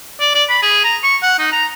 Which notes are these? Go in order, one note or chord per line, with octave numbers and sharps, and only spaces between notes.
D5
D5
B5
G#4
A#5
C#6
F#5
D#4
A#5